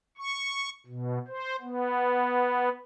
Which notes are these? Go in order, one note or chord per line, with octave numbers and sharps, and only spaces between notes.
C#6
B2
C5
B3